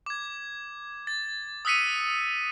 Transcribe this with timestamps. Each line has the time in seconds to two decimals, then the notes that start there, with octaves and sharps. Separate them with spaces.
0.06 D6 G#6
1.07 A6
1.65 D#6 E6 F#6 B6 C#7 D#7